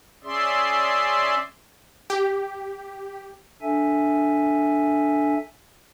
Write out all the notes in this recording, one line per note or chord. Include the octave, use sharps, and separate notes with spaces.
C#4 G#4 D5 E5 C6
G4
D4 A4 E5 G#5